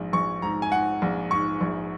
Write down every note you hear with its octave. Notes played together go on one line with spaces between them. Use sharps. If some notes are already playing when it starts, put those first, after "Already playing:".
Already playing: A#1 G#2
A#1 C#6
G#2 A#5
G#5
G#2 F#5
A#1
G#2 C#6
A#1